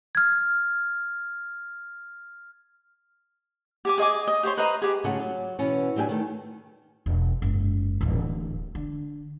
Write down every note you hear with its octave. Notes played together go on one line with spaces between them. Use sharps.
F6 G#6
G4 G#5 D6
G#4 D#5 G#5 D6
D#5
G4 C5 C#5 C6
B4 C5 D#5 A#5
G4 G#4
G#2 C#3 A3 F4 G#4 F#5
F#3
B2 E3 B3 C#4
F#3 D4 G4 F5 G#5
D#3 A3
E1
F#1 G#2
D1 A1
D3